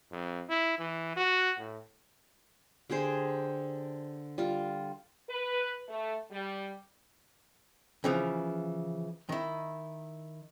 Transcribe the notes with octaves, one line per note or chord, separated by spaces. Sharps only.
F2
E4
E3
F#4
A2
D3 G4 G#4 C5
G3 F4
B4
A3
G3
C#3 E3 F3
D#3 E4